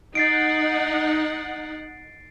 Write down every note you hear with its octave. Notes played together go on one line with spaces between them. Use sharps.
D#4 F#5 A6 C7 D7